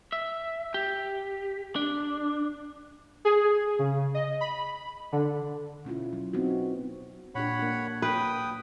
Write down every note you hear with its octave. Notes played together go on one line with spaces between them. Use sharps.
E5
G4
D4
G#4
C#3
D#5
B5
D3
B2 C#4 E4 F4
F#3
B3 C4 D#4 F#4
A#2 D4 G4 C#5 F#5 B5
A#3 D4
B4 G5 D#6